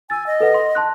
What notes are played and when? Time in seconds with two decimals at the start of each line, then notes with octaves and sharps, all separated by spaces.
0.10 G#5 E6 A6
0.27 D#5
0.40 A4 B4 F#5
0.54 C6
0.75 A5 C6 F#6